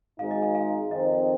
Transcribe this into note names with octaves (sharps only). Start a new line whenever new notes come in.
G#1 G#2 G#3 D#4 F5
D#5
F5
F5
F2 D#3 C4 D#4 D#5